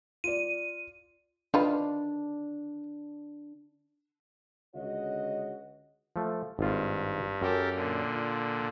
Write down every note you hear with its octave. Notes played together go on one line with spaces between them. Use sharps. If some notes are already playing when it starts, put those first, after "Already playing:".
F4 D5 D#7
D#3 D4 F4 B4
C#2 D3 F#4 C#5 D#5
F3 A3
G#1 G2 F4
F#2 G4 A4 A#4
A#2 D3
F4